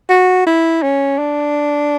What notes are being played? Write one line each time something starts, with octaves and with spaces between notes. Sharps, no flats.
F#4
E4
C#4
D4